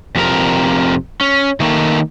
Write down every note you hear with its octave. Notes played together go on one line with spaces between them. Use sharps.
F2 C3 A#4
C#4
D#3 A3 A#3